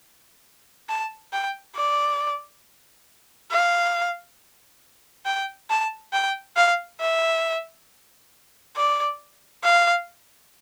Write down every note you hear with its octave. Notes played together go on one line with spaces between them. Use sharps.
A5
G5
D5
F5
G5
A5
G5
F5
E5
D5
F5